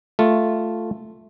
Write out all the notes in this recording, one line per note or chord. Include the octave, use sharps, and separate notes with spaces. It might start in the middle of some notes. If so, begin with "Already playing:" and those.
A3 F4